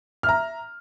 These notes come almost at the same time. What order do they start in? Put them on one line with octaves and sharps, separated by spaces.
F6 E5 A#5